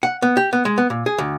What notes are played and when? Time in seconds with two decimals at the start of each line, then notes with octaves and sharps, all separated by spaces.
0.03 F#5
0.22 B3
0.37 G4
0.53 B3
0.65 G#3
0.78 B3
0.90 A#2
1.06 G#4
1.18 D2